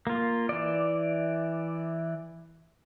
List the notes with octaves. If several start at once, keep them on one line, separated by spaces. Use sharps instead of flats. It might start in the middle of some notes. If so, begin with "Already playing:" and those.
A#3 F4
E3 D5